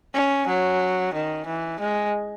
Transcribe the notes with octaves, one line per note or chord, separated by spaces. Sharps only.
C#4
F#3
D#3
E3
G#3